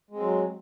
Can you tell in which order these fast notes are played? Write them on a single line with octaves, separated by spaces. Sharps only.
G#3 C4 F#3